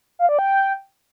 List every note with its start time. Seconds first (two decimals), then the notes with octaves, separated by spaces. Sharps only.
0.19 F5
0.29 D5
0.39 G5